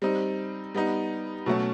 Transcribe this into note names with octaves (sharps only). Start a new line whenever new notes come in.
G3 C4 D#4
G3 B3 D#4
B2 F#3 A3 C#4